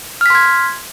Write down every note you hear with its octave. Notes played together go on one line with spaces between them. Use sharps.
C6 F6 G#6 B6